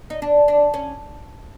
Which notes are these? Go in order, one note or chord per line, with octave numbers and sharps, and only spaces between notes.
D#4
D4
D4
C#4